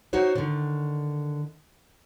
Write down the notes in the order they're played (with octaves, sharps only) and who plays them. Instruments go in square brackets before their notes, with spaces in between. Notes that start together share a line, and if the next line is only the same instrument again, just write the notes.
[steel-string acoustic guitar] D#4 F#4 C5 C#5
D3 D#3